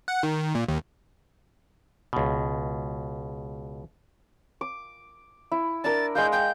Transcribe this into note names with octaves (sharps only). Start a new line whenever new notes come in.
F#5
D#3
A#2
D#2
C#2 B2
D6
E4
D4 A#4 A6
G#3 D#5 F5 G6
G5 G6